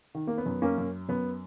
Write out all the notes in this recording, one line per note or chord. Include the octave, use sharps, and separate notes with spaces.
D#3
A#3
B3
F#2
A#3 C#4
F#2
F#2 B3